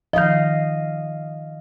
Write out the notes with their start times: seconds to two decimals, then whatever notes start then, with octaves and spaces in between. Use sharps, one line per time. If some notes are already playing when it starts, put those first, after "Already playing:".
0.13 D#3 F3 D#5 F5